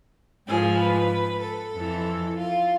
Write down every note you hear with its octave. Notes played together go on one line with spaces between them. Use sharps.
G#2 F3 G#4
B4
A4
F2 E3
F4